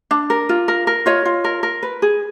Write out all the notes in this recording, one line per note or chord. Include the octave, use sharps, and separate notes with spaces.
D4
A#4
F4
A#4
A#4
F4 C#5 D#5
F4
A#4
A#4
B4
G#4